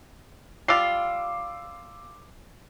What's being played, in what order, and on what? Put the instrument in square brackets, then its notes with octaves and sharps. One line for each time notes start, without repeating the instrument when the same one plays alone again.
[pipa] G3 F4 [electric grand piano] D6 E6 C7